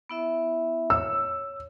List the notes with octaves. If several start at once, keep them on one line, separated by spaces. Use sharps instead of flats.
B3 E4 E5
C#5 E6